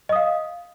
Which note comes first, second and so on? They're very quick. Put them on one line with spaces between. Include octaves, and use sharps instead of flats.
D#5 D#6 F5